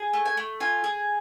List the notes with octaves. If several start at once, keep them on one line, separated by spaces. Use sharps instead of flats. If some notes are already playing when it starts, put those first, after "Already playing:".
Already playing: G#4
A3
G#5
A3
F4 G#5
G#4